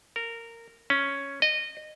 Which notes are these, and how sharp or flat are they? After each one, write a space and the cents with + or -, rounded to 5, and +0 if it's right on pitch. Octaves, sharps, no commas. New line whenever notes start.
A#4 -15
C#4 +0
D#5 -20